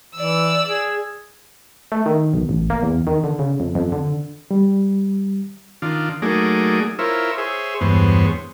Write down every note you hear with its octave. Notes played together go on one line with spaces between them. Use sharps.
E3 D5 E6
G#4
A3
D#3
B1
A1
A#3
E2
D#3
D3
C#3
F2
F2
D3
G3
D#3 D4 F4
F#3 A3 A#3 D#4 G#4 D5
E4 F4 A#4 C5 C#5 E5
G#4 C5 C#5 E5
E2 G2 G#3 B3 C5 C#5